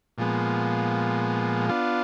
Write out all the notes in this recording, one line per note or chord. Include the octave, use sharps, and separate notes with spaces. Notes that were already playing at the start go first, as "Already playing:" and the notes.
A#2 F3 G#3 B3
B3 D4 F4